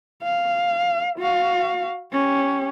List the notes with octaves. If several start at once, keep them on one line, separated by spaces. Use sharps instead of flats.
F5
F#4 F5
C#4 G4